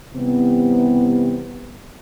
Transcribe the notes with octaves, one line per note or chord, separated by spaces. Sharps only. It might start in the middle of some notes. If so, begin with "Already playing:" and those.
C3 E3 G3 B3